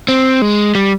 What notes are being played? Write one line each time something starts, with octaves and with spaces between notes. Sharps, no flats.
C4
G#3
G3